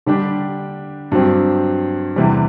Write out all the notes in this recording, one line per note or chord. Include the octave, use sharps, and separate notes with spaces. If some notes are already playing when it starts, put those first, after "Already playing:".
D3 G3 D4 G4
G2 F#3 C4 G4
E2 C3 E3 G3